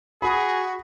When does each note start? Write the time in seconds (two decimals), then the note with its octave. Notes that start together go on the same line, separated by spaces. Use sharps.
0.22 F#4 G#4 B5